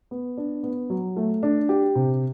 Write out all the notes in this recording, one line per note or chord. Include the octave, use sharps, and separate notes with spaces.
B3
D4
B3
F#3
A3
D4
G4
C3